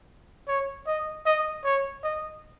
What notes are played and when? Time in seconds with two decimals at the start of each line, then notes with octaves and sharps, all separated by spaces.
0.48 C#5
0.87 D#5
1.26 D#5
1.64 C#5
2.03 D#5